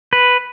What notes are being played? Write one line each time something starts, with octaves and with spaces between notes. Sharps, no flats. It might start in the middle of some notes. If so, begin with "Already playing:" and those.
B4